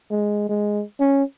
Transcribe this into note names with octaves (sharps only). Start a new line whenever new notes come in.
G#3
G#3
C#4